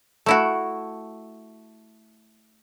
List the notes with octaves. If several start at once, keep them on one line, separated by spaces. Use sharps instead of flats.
A3 E4 F#4